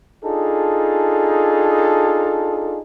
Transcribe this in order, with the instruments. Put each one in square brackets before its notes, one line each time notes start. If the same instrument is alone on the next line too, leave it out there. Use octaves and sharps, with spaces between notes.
[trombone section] D4 D#4 F4 G#4 A4